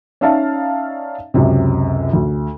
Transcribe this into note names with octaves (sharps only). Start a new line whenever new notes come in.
C#4 D#4 D5 E5 F5 A5
C#2 F#2 C3
D2